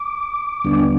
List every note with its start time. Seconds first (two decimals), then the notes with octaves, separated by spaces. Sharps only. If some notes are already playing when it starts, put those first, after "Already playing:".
Already playing: D6
0.64 D#2 D3 G3 B3 D4